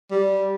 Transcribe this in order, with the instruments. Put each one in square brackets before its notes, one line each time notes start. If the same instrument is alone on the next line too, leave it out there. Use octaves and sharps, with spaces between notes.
[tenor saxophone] G3